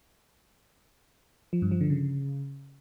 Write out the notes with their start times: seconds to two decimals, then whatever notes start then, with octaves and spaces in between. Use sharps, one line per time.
1.53 F3
1.62 G2
1.71 F3
1.81 D3
1.90 C#3